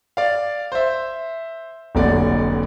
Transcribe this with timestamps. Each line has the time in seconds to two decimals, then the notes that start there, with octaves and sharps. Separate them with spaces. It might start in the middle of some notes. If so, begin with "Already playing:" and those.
0.17 D5 F5
0.72 C5 E5
1.95 F1 B1 A#2 D3 D5